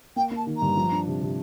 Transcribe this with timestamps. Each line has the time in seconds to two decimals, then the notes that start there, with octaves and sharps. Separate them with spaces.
0.16 A#3 G5
0.31 A#3 A5
0.47 D#3
0.57 A#5
0.62 G2
0.77 F3
0.92 D4
1.07 C3
1.22 C3